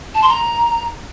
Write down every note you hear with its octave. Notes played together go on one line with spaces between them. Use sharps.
A5
C6
A#5